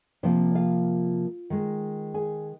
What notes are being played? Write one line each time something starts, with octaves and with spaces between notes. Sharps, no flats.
C3 F3 A#3 C4 C5
F4 F5
D#3 G#3
G#4 G#5